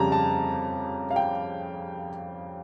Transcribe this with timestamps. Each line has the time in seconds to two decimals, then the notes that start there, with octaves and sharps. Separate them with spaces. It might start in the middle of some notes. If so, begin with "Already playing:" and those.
Already playing: F2 C#3 G3 A5 A#5
0.12 A5
1.11 F5
1.16 G5